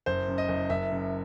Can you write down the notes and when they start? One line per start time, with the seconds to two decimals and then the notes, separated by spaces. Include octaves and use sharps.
0.06 F#1 C5
0.28 F#2
0.38 D#5
0.48 F#1
0.69 F#1 E5
0.91 F#2